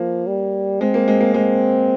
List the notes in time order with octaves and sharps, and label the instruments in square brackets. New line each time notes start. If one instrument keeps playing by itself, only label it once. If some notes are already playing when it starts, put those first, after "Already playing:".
Already playing: [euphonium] F3 [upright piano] A#3
[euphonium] G3
[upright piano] G#3 [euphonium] C4
[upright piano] A#3
G#3
A#3
[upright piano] G#3 [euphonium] C4